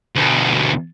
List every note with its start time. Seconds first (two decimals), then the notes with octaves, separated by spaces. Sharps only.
0.15 D2 B2